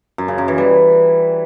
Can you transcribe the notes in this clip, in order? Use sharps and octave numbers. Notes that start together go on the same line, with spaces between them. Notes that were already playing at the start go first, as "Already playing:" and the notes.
F#2
C#3
F#2
E3
G3